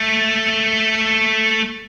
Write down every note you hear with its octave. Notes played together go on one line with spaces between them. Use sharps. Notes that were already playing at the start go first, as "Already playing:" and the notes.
Already playing: A3